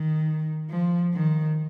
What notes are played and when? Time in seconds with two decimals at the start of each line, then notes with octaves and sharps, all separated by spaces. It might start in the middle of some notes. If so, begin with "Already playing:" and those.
Already playing: D#3
0.70 F3
1.14 D#3